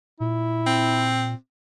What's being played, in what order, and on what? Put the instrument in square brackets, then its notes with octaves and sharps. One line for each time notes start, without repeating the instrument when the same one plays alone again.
[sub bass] A#2 [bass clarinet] E4
[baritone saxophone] C4